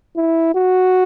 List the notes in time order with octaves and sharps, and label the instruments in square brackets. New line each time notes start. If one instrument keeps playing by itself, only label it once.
[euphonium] E4
F#4